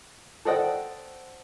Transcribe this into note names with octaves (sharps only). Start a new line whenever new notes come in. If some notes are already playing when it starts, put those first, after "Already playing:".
A4 C5 D5 D#5 F#5 G5